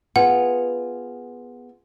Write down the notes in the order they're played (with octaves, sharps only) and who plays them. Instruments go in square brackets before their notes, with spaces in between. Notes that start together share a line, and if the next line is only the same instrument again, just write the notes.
[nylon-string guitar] B3 F4 G#4 [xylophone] F#5